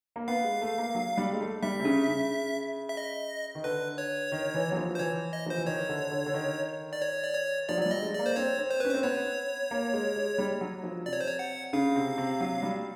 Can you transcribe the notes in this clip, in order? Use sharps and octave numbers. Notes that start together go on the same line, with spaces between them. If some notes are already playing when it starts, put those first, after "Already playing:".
A#3
B3 F5
G#3
A3
A#3
F#3
G3
G#3
A3
G3 E5
C3
C#3
C#3
E5
D#5
D#3
D3 B4
C#5
D#3
E3
F#3
F3
C5
E3 C#5
D#5
F3 C5
E3
D#3 C#5
D3
D3
D3
D#3
D5
C#5
D5
C#5
F3 D5
F#3
G3 D5
D#5
G#3
D5
A#3
C5
C4 C#5
C4
C5
C#4 B4
C4 C5
B3 C#5
A#3
G#3
G#3
G3
F#3
F3
C3 D5
C#5
C5
C#5
F#5
C#3 F5
C3
C3
F#3
G3